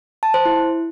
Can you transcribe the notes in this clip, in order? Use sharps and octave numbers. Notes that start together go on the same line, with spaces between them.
A5
C5
E4